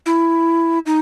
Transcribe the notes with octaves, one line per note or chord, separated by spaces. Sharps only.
E4
D#4